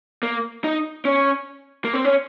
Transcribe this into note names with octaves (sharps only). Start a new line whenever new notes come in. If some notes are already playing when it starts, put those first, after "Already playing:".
A#3
D#4
C#4
A#3
C4
C#4